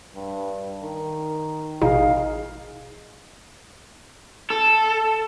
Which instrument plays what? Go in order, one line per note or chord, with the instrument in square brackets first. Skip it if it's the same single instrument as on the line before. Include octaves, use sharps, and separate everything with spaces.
[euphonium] G2
D#3
[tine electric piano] A1 G#4 D#5 [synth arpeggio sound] B2 D#4 [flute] F5
[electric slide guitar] A4